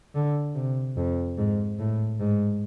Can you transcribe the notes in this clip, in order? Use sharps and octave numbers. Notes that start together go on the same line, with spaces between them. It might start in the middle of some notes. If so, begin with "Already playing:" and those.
D3
C3
F2
G#2
A2
G#2